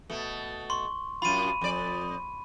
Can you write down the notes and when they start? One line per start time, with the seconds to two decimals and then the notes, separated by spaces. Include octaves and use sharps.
0.10 B2 A3
0.70 C6 C#6
1.22 F#2 F4 B5 D#7
1.61 F2 D5